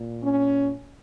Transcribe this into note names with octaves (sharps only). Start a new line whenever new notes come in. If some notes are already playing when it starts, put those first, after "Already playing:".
Already playing: A#2
C#4